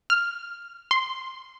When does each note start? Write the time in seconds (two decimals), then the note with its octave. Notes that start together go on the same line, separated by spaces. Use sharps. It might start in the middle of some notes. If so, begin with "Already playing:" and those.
0.10 F6
0.91 C6